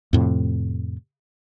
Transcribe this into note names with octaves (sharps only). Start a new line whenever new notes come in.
F2 A2 C3